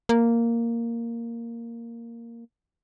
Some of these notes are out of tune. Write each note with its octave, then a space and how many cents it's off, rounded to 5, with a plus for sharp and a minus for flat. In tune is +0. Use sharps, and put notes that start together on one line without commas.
A#3 -5